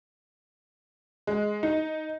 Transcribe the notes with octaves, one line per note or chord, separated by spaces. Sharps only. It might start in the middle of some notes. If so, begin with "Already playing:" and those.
G#3
D#4